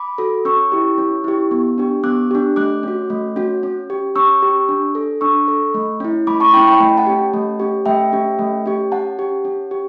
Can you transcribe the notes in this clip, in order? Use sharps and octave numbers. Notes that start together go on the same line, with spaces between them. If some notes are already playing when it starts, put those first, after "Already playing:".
Already playing: B5 D6
F#4 A4
C#4 C#6 E6
E4 G4
C#4
E4 G4
B3
D4 G4
B3 D6 F#6
D4 G4
A3 D6 F#6
C#4 F#4
A3
C#4 F#4
C#4
G4
C#4 C#6 E6
G4
D4
A4
D4 C#6 E6
A4
A3
C#4 E4
A3 B5 D6
A5 C#6
C#4 E4 G5 B5
G5 B5
A3 A5
G5
F#5 A5
C#4 G4
A3
C#4 G4
A3 E5 G5
C#4 G4
A3
C#4 G4
C#4 F#5 A5
G4
C#4
G4